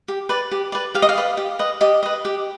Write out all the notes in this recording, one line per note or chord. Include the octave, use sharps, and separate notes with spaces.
G4
B4 D5
G4
B4 D5
G4 F5
D#5
F5
B4 D5
G4
B4 D#5
G4 D#5
B4 D#5
G4